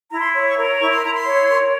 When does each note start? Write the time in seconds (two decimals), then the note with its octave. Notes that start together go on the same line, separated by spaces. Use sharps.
0.11 E4 A#5
0.19 C6
0.35 C#5
0.49 C#6
0.58 A#4
0.80 E4 C#6
0.91 C6
1.03 E4 A#5
1.13 C6
1.26 C#5
1.48 A#4